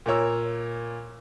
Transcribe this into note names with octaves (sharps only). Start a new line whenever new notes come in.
A#2 A#4 C#5 E6